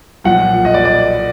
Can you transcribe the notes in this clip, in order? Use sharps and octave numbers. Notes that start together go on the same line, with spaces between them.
B1 A#2 F3 F#5
D#5
D5
D5